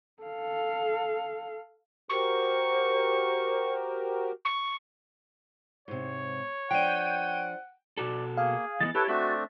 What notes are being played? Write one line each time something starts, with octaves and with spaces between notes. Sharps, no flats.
A4 F5
F#4 G4 A#4 C5 C#6
C#6
G#2 C3 C#5
F3 D4 F#5 G5 D#7
B2 F#4 A4 D5
A#3 G#4 F5
E3 G#3 B3 D#5 A6
E4 G4 A4 B4 C#5 A5
A3 C4 D4 F#4 E5